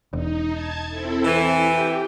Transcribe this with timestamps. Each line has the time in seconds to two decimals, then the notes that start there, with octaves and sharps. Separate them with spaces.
0.13 E1 D#4
0.51 A5 G#6
0.89 C4 E4 A4
1.25 E3
1.61 G4 G5